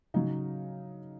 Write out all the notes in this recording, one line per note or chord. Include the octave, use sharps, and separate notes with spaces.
C#3 F#3 D#4